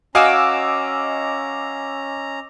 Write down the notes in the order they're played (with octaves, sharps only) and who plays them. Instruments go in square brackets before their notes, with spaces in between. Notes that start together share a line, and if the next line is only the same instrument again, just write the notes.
[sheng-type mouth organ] C#4 A#5 [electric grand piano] F#4 F5 G#5 [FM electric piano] D#5 D6 E6